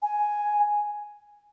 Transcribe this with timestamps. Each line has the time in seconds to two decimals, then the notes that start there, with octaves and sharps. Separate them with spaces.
0.02 G#5